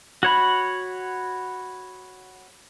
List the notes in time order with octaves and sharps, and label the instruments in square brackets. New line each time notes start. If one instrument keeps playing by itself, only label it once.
[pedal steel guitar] F#4 C#5 B5